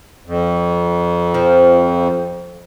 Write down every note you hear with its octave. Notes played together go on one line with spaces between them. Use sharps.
F2
F3